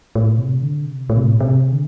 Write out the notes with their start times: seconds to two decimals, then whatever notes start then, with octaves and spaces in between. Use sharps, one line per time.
0.15 A2
0.38 C3
0.62 D3
0.85 C3
1.10 A2
1.17 C3
1.24 A2
1.40 C3
1.72 D3